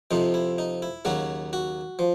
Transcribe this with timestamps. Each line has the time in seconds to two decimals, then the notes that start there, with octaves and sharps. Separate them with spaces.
0.11 F2 C3 F3 D#4
0.34 E4
0.58 D#4
0.82 E4
1.05 D#2 C#3 F#3 F#4
1.53 F#4
1.99 F3